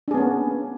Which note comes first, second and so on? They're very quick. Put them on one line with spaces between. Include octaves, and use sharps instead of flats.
D4 G#4 B3 C#4 A#3